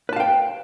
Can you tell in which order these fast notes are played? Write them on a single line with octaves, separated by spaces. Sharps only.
B4 A5 F5 G5